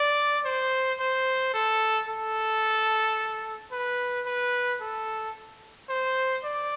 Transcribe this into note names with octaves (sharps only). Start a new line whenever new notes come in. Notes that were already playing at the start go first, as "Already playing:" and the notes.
Already playing: D5
C5
C5
A4
A4
B4
B4
A4
C5
D5